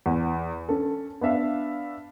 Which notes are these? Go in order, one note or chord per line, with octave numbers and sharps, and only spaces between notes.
E2
C#4 A4
B3 D4 E5 F5